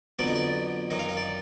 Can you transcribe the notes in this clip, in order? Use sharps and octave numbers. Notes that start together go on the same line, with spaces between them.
F2 D3 F#3 B3 D5
D#5
D5
F#2 D#3 F#3 D#5
F5
D#5
D5